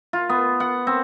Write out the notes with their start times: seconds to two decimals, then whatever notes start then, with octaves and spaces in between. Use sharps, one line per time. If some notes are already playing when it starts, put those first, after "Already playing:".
0.13 F4
0.29 B3
0.60 F#5
0.87 C4